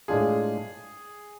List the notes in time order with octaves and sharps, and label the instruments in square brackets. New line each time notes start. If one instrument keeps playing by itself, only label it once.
[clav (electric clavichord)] A2 G#3 D4 F4 [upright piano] G#4